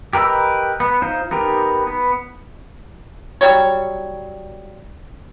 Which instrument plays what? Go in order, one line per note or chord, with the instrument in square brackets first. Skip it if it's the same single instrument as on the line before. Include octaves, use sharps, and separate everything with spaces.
[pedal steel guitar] G4 A#4 B4 D#5 E6
B3
D#4 F4 C5
B3 D#4 G4 A#4
B3
[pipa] F#3 G3 C#5